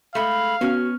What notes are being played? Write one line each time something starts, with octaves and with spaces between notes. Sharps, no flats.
G#3 A3 F5 B5
B3 C#4 F#4 F6